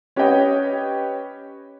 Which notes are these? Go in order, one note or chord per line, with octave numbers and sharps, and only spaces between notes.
C#4 G4 B4 C#5 D#5 G5